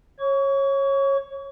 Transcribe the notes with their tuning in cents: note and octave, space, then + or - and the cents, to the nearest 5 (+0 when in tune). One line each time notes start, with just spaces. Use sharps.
C#5 -20 C#6 +30